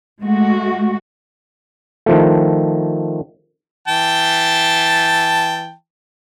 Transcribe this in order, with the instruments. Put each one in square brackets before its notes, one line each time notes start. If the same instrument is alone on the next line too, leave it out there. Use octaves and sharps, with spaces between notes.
[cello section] G#3 A3 F#4
[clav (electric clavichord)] D#3 F3 A3
[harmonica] E3 G5 A5